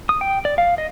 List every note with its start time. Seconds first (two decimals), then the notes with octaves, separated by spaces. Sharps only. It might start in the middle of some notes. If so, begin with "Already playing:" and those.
0.09 D#6
0.21 G5
0.45 D5
0.58 F5
0.78 D#5